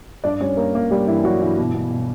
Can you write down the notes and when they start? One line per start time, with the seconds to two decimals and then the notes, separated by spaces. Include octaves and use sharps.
0.24 G2 D4 D5
0.41 G3 C#4 C#5
0.57 G3 A#3 A#4
0.74 G2 A#3 A#4
0.91 G2 G3 G4
1.07 G2 E3 E4
1.24 G2 F#3 F#4
1.40 G2 E3 E4
1.58 B2
1.74 B2
1.91 B2